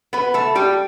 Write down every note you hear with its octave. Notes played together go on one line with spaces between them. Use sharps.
B3 B4
A3 A4
G3 G4